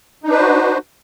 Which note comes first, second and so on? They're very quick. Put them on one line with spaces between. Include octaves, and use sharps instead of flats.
D#4 D4 B4 C5 F#4